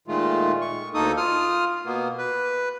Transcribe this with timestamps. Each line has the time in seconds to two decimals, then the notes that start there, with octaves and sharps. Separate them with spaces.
0.08 A#2 D#3 G#3 A3 F4
0.61 C#6
0.94 D2 A#3 D#4 A4 D#6
1.17 F4 D#6 F6
1.85 B2 A#3 B3
2.18 B4